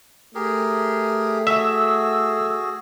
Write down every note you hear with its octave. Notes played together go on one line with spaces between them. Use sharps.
A3 G4 G#4 A#4
F#4 G#4 E5 E6